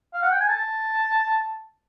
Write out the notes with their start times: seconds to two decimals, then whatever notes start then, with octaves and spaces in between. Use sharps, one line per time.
0.13 F5
0.22 F#5
0.31 G5
0.40 G#5
0.49 A5